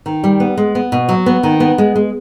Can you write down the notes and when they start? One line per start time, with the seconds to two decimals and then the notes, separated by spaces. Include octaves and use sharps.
0.06 D#3
0.24 G3
0.40 B3
0.57 G#3
0.75 B3
0.92 B2
1.09 F#3
1.26 B3
1.43 D#3
1.60 B3
1.78 G#3
1.96 G#3